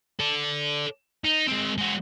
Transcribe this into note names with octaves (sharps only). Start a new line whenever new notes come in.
A4 D5
D#4
G#3 C4
G#3 F#4